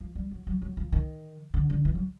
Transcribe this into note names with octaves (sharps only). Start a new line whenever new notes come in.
F3
G3
F#3
F#3
F#3
F3
D#3
D3
D3
E3
F#3